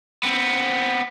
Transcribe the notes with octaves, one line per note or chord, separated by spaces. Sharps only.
B3 C4